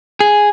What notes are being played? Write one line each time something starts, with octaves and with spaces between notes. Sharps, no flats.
G#4